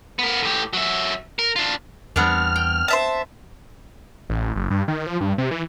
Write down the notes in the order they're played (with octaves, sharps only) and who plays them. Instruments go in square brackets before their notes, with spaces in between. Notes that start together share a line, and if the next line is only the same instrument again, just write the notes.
[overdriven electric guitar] B3 A#4
A2 G4
F#3 E5
A#4
D4 F4
[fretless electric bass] E2 G3 [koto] B3 C4 D4 [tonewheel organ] F6
[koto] G5
[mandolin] C5 E5 A5
[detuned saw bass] A1
F#1
G2
D#3
F3
G2
C3
E3